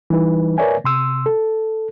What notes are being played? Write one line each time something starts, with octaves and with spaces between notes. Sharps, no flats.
E3 G3 D#4 B4
A#4 B4 C#5 D5 E5 G#5
C3 C6 E6
A4